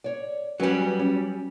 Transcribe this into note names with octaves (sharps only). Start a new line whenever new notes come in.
C#5 D5
F#3 G3 C#4 B4 G#5
C#4